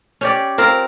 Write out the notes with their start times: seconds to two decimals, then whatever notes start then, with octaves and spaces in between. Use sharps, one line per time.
0.21 C#4 G4 D5
0.58 C4 F4 A#4